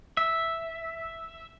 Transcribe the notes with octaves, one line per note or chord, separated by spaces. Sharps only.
E5